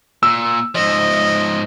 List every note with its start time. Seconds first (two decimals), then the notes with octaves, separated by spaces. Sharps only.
0.23 A#2 E6
0.75 G#2 F3 D#5